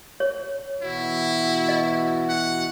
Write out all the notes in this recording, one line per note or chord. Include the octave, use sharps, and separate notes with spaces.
C#5
B2 E3 E4 F#4
D#5
F#5